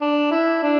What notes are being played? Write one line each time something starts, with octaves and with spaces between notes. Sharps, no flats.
D4
E4
D4